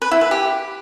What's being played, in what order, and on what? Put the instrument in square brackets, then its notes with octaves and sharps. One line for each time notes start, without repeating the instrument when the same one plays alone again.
[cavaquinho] B4
E4
B4
G4